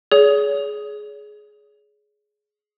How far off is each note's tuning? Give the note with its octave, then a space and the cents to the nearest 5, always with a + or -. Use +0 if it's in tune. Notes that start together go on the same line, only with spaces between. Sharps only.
G#4 +15 C#5 +40